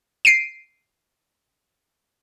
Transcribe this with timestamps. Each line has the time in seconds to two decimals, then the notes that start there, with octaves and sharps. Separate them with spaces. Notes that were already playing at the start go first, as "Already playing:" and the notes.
0.25 C7 D7 D#7